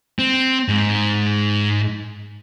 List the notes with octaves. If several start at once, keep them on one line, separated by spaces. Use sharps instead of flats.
C4
G#2